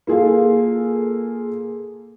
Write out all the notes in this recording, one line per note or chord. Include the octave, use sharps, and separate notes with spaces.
A#3 F4 G#4 A4 F5